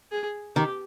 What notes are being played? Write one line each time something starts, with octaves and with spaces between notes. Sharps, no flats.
G#4
D#3 G4